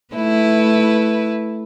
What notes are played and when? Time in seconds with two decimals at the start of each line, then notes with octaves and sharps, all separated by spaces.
0.15 A3 E4 B4